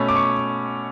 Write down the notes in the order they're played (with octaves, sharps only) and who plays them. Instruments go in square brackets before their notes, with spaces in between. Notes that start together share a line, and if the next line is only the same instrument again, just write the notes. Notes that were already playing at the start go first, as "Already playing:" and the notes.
Already playing: [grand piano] B2 A3 C#4 B5
D6
C#6